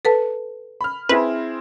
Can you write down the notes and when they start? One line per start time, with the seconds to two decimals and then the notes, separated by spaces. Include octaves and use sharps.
0.05 A4 B4 A5
0.81 B5 F6
1.09 C4 E4 G#4 B4